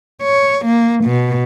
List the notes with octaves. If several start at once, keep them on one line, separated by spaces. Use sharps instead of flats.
C#5
A#3
B2